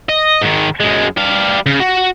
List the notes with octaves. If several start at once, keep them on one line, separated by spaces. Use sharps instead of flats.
D#5
G#2 D#3
F#2 G#3
G3 F5
C#3
F#4